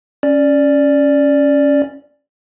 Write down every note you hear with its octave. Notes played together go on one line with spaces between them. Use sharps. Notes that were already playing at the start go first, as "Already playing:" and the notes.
C#4 D5